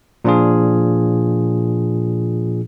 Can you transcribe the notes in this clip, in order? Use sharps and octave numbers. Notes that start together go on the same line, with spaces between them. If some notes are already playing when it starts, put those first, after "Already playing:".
A#2 F3 D4 F4 G#4